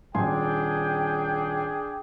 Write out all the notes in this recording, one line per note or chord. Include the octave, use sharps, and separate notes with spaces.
D#1 D4 G#4 G5 G#5 C6